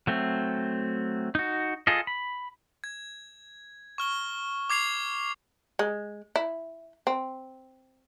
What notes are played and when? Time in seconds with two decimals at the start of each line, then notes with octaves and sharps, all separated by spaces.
0.07 F#3 A3 C4
1.35 D#4 F#4
1.87 F4 G#4 A4 D#5
2.07 B5
2.84 G#6
3.98 C#6 F6 G7
4.70 D6 G#6 C7 F7
5.79 G#3
6.36 E4
7.07 C4